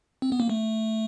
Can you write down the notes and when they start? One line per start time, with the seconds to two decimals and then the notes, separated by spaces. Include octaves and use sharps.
0.22 C4
0.32 B3
0.40 A#3
0.50 A3